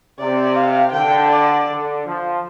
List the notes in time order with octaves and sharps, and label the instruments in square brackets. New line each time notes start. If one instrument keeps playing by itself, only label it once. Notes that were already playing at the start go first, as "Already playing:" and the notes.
[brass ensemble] C3 [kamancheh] D5
[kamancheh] F5
[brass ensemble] D3 [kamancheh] G5
[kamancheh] D5
[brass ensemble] D3
F3